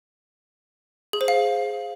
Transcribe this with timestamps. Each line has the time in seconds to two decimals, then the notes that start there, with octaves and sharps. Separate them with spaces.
1.13 G#4
1.21 C5
1.28 F5